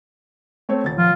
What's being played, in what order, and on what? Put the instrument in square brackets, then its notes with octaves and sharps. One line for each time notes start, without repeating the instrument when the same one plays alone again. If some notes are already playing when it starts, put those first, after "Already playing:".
[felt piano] A3 C4 C#5
D#1 A6
[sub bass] F3 [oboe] F4